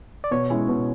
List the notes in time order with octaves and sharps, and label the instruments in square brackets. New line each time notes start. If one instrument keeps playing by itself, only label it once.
[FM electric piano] D5
[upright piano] B2 [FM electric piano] C#5
[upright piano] G#3 C#4 E4
B2